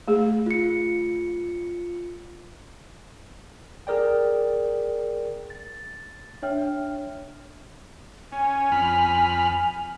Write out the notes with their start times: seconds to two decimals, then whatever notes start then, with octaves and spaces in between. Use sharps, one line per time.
0.08 A3 G#4
0.46 F4 C#7
3.87 G#4 A#4 D5 G5
5.50 A6
6.42 D4 C#5 E5 G5 F6
8.32 C#4 G#5
8.72 F2 B5 F6